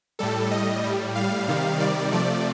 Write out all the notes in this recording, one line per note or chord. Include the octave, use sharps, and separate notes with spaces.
A2 G3 A4
D#5
A2 G3
F5
C3 D#3 G3
D5
C3 F3 A3 D5